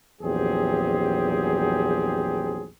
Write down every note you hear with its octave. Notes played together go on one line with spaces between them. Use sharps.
A#1 E2 F#3 C4 G4 G#4